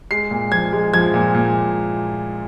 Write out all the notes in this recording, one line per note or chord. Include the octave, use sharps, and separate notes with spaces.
G#3 C7
A#2
F3 G#6
G#3
F3 G#6
A#2
A#2